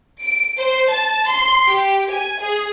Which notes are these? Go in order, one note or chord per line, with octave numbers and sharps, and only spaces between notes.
D7
C5
A5
C6
G4
G#5
G#4